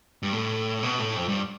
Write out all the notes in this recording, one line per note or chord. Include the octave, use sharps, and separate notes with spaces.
G2
A2
B2
A2
F2
G2